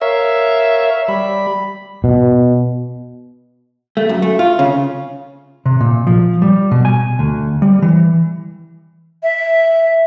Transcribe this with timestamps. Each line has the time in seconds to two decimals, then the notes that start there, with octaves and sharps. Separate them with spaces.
0.02 A#4 C#5 E5 F5
1.08 G3 B5
2.04 B2
3.97 A3
4.09 F#2
4.22 A3
4.39 F4
4.59 C#3
5.66 C3
5.81 A#2
6.07 F3
6.42 G3
6.71 B2
6.85 G#5
7.19 D2
7.62 G3
7.82 E3
9.23 E5